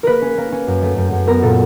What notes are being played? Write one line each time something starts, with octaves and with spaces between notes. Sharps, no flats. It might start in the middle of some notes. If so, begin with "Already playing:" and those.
A#3 A#4 B4
C#4
A#3
C#4
F#2
A3
F#2
F#2
B3 A#4
A#2 A4